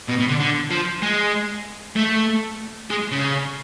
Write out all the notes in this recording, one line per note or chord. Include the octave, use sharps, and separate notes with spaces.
B2
B2
D3
D3
F3
G#3
A3
G#3
C#3